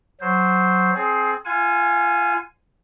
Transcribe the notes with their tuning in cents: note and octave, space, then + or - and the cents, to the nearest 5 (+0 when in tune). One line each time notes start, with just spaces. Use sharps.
F#3 +0 C5 +0
C4 +0 G#4 +25
F4 -25 F5 +45 G#5 +0